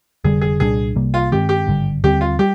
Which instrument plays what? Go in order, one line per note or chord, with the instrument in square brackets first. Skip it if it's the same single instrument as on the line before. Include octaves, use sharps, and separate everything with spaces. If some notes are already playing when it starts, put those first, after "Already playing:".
[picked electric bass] F1 F2 D3 G3 [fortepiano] G#4
[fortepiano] G#4
[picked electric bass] C2 A#2 G3 D4 [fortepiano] G#4
[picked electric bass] C2 C3 G3 A#3
[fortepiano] F4
[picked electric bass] G2 D#3 G#3 C4 [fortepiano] G4
[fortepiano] G4
[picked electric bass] G#1 G2 D3 G3
[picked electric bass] D#2 D3 G3 C4 [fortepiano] G4
[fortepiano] F4
[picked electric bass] G3 [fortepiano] G4